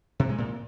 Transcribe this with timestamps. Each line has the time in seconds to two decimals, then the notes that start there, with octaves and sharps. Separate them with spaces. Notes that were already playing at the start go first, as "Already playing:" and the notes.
0.20 C3
0.29 G#3
0.38 A#2